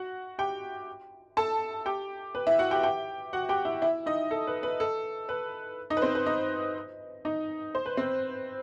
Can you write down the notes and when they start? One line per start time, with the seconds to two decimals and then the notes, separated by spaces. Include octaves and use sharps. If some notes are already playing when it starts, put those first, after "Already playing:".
Already playing: F#4 F#5
0.38 G4 G5
1.37 A4 A5
1.86 G4 G5
2.35 B4
2.47 E4 E5
2.59 F#4 F#5
2.71 G4 G5
2.83 G4 G5
3.33 F#4 F#5
3.49 G4 G5
3.65 E4 E5
3.82 E4 E5
4.06 D#4 D#5
4.31 A4
4.47 B4
4.63 B4
4.80 A4
5.29 B4
5.90 D#4 D#5
5.97 B4
6.02 C4 C5
6.15 B4
6.26 D#4 D#5
7.25 D#4 D#5
7.75 C5
7.86 B4
7.97 C4 C5